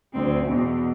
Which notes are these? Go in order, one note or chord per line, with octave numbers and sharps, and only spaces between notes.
D2 C4
E2 B2